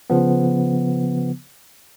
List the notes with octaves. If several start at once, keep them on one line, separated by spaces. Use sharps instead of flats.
C#3 F3 B3